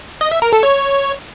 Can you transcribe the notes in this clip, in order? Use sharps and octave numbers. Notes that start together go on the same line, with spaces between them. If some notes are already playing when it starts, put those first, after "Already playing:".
D#5
E5
A#4
A4
C#5